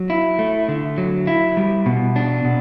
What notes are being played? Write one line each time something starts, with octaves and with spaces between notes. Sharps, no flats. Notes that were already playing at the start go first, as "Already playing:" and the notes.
Already playing: F#3
E4
A3
D3
F#3
E4
G3
B2
D4
B2